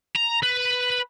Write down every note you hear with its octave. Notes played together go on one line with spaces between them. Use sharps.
A#5
B4